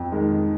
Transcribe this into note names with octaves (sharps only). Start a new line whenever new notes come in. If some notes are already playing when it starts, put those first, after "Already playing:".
Already playing: F2
D#3 G#3